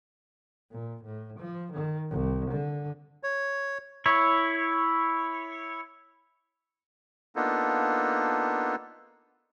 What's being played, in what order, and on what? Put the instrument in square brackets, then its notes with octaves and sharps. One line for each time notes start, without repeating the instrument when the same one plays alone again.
[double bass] A#2
A2
F3
D#3
C2
D3
[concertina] C#5
[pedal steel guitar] E4 C#5
[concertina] A#3 B3 D4 D#4 F4 A4